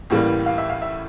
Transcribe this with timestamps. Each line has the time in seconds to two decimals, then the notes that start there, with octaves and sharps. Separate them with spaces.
0.10 A1 A2 E3 G3 A#3
0.46 F5
0.58 E5
0.70 F5
0.82 E5